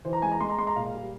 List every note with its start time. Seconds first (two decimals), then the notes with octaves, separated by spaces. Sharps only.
0.05 E3 C5
0.13 A#5
0.22 G#3 G#5
0.32 A#5
0.41 G#3 C6
0.50 A#5
0.58 G#3 C6
0.67 A#5
0.76 A#2 F5
0.94 G3